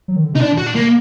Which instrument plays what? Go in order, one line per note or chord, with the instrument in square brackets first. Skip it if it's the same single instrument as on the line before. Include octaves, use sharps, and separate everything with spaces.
[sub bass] F#3
D#3
D3
[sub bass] C3 [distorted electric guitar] D#4
[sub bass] A#2 [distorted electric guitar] D4
[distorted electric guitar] F#4
D4
A#3